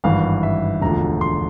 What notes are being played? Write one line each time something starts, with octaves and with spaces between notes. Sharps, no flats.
G#1 G2 E3 F5
E5
E1 D2 D3 F3 A#5
C6